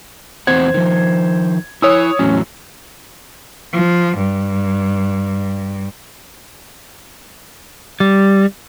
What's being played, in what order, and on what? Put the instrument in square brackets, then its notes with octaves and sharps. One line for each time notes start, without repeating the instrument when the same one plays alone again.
[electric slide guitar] E2 C4 F#5 [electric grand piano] C5 G#6
[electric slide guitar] D#3 F3
[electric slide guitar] E4 G#5 [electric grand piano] C#5 D#6 E6
[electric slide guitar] E2 A2 F#3 [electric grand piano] C#4
[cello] F3
G2
[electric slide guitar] G3